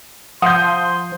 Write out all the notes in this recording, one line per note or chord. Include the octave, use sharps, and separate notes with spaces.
F3 F#5 C6 D#6 G6